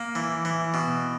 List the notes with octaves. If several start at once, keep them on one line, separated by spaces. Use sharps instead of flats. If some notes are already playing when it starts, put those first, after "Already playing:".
Already playing: A#3
E3
E3
B2